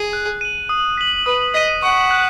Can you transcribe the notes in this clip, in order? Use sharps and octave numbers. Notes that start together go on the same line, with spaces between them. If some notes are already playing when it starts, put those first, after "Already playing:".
Already playing: G#4
F#6
D#7 F#7
D#6
B6 F#7
B4 D#6
D#5 B6 D#7
F#5 C#6
F#6